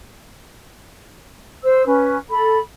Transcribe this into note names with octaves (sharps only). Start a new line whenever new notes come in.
C5 E6
C#4 B4
A4 B5